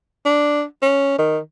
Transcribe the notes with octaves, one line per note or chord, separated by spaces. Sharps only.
D4
C#4
D#3